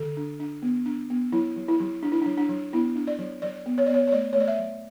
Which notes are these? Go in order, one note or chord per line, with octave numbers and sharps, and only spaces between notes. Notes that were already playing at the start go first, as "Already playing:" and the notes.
Already playing: D3 A4
D4
D4
B3
D4
B3
F#3 E4
F#3
E4
F#3
F#3 D4
E4
F#3 D4
D4
F#3
B3 E4
D4
D5
F#3
F#3 D5
B3
C#5
B3 D5
C#5
C#5
A3 D5
C#5
A3 D5
E5
F#3